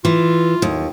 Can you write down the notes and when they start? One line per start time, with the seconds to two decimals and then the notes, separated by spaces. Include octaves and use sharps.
0.05 E3 F4
0.62 D#2